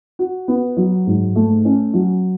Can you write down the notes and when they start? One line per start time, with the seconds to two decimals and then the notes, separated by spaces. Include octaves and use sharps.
0.19 F#4
0.48 B3
0.77 F#3
1.06 G#2
1.36 A3
1.65 C#4
1.94 F#3